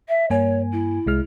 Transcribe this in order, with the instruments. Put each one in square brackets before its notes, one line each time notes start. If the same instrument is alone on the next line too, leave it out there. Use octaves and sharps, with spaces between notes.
[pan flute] E5
[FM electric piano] G2 A#3 G#5 [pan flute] C#5
[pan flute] E4
[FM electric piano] C2 G#3 F6